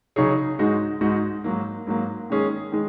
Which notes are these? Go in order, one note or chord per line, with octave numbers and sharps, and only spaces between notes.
C#3 F#3 D#4 G#4 C#5
G#2 G#3 D#4 F#4
G#2 G#3 D#4 F#4
G#2 F#3 A#3
G#2 F#3 A#3
D#3 G#3 C#4 G#4
D#3 G#3